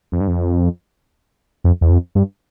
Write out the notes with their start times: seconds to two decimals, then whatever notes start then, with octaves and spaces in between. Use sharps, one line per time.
0.12 F2
0.20 G2
0.28 F2
1.64 F2
1.81 E2
1.90 F2
2.15 G2